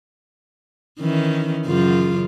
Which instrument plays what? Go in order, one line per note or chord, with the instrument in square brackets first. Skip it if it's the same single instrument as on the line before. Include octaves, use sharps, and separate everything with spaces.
[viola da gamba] D#3 E3 C#4
F#2 C#3 F4